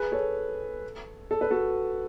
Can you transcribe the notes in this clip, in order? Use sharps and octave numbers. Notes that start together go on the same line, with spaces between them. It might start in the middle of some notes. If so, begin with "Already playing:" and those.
Already playing: G#4 B4
A4 C#5
A4
B4
F#4 A4